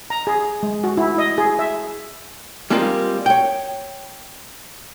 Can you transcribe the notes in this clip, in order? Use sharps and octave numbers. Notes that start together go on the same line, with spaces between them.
A#5
G#4
G#3
F#4
E4
D#5
G#4
E5
G3 G#3 A#3 C4 F4
C#5 G5